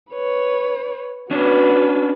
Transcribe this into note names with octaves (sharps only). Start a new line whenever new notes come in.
B4 C#5
C#4 D4 F#4 B4